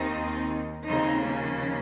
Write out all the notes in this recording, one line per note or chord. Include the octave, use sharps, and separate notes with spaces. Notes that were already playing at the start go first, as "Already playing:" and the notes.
Already playing: D#2 D#3 C4 D#4
D#2 C#3 F3 C4 D#4
A#3 C#4